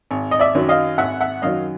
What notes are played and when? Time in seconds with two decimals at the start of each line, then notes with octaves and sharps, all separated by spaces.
0.11 G#1
0.31 D#5
0.39 D5 E5
0.55 F#2 D#3 F#3
0.69 D#5 F5
0.98 G#1 E5 F#5
1.21 E5 F#5
1.42 F#2 D#3 F#3 D#5 F5